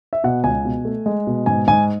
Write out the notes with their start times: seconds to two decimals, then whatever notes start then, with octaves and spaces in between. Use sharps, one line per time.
0.13 E5
0.24 B2 F#5
0.44 C#2 G#5
0.65 B2
0.85 A3
1.06 G#3
1.27 B2
1.46 G#2 G#5
1.68 G#2 G#5